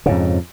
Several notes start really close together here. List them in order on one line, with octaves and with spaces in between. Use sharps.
C#3 G#2 F2